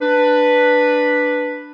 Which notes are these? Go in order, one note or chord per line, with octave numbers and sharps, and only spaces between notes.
D4 B4